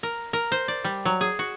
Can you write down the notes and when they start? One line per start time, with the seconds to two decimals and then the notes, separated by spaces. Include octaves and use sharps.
0.03 A#4
0.33 A#4
0.52 C5
0.68 D5
0.84 G3
1.05 F#3
1.21 G#4
1.39 F#4